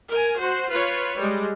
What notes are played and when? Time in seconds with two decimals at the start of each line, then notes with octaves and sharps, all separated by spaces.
0.10 A#4 G#5
0.39 F#4 C5
0.71 F4 B4 C#5
1.18 G3 G#3